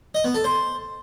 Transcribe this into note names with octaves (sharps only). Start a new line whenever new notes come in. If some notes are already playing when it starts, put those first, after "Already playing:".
D#5
B3
A4
C5